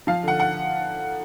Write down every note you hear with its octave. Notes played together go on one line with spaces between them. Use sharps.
F3 F5
D3 F#5
F#5